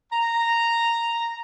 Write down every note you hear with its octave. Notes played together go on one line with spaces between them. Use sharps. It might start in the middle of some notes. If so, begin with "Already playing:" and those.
A#5